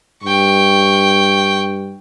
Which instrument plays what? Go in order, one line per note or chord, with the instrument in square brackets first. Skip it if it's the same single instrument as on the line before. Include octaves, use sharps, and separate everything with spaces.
[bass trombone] G2 [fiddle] G5 C#6